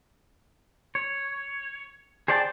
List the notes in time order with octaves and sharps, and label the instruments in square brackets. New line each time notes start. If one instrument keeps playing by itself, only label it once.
[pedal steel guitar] C#5
G#4 C5 D5 G5 A5